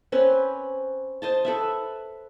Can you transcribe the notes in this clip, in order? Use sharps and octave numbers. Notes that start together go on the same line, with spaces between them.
C4 C#4 B4
C5 D#5 A5
A4 B4 E5